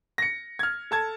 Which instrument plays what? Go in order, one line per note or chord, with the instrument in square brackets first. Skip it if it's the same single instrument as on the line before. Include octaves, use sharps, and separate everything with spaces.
[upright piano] A#6 C#7
F6 G#6
A4 A5 G#6